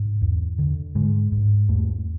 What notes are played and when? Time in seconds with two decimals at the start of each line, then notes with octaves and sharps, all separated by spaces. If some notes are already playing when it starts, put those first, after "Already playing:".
Already playing: G#2
0.22 E2
0.58 D3
0.95 G#2 G#3
1.32 G#2
1.69 E2 A3